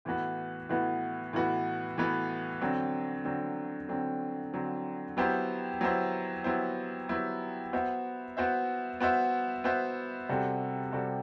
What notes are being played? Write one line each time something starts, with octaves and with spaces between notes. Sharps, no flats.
A2 E3 B3 F#4 B4
A2 E3 B3 F#4 B4
A2 E3 B3 F#4 B4
A2 E3 B3 F#4 B4
D3 F#3 C4
D3 F#3 C4
D3 F#3 C4
D3 F#3 C4
F#3 B3 E4 G4 C5
F#3 B3 E4 G4 C5
F#3 B3 E4 G4 C5
F#3 B3 E4 G4 C5
B3 F#4 C5 E5
B3 F#4 C5 E5
B3 F#4 C5 E5
B3 F#4 C5 E5
C3 G3 C4 F#4 A4
C3 G3 C4 F#4 A4